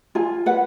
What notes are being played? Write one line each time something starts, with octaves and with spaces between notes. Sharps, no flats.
F4 G#5
B4 F#5